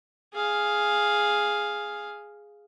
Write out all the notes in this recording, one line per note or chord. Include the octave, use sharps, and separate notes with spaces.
G#4 F5